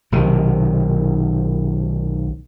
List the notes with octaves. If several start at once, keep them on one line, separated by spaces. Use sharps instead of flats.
B1 C3 D#3